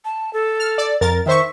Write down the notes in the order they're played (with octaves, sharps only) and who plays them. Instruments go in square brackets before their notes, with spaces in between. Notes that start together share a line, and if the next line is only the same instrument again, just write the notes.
[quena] A5
A4
[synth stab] F6
D5
F2 A#4 A6
[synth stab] D#3 C5 C#6 [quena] E5